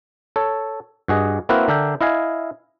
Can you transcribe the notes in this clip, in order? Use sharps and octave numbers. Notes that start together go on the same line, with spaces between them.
A4 C#5
G2 F#4 G#4 D#5
A#3 C4 E4 F#4 A#4 B4
D3 D4 A#4 E5 G5
E4 D#5 F5 G#5